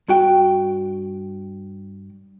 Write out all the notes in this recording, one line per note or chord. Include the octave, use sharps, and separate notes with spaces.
G2 F#4 G5